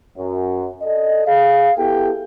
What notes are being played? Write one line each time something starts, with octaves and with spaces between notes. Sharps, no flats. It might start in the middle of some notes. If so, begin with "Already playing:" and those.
F#2
A4 D5 D#5
G#4 F5
B3 E4 G4 A4 G5